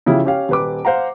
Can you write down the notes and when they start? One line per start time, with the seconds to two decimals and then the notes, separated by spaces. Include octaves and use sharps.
0.06 C#3 F3 E4 F4 G4
0.25 C#4 G4 F5
0.49 D#1 B4 D6
0.85 C5 F5 F#5 A#5